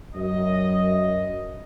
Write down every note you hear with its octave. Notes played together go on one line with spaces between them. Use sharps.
F#2 D#5